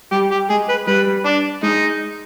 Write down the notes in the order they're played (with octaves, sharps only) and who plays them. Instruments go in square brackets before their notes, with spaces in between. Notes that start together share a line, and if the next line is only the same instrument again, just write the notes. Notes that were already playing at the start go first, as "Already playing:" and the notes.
[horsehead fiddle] G3 [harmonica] G4
[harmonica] G4
[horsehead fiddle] G#3 [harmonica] G#4
[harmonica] B4
[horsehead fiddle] G3 [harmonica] B4
[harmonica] D4
[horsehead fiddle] G#3 [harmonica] D#4